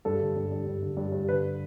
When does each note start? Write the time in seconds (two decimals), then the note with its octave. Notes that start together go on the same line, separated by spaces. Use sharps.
0.05 G2 A4
0.20 D3
0.36 G2
0.51 G2
0.67 G2
0.83 D3
0.97 G2
1.12 G2
1.28 D3 B4